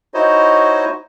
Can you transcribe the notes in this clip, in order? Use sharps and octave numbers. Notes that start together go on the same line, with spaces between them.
D#4 E4 F#4 C5 C#5 D#5